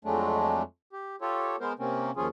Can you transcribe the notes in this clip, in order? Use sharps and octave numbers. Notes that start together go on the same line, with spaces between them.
F2 F#3 G#3 A3 D4
G4
F4 G4 A4 C#5
G#3 B3 A#4 C5
C3 A#3 C4 C#4
D#2 F3 C#4 F4 G#4